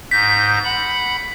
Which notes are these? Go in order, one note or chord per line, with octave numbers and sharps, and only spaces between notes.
G#2 G6 A#6 B6
F#5 B5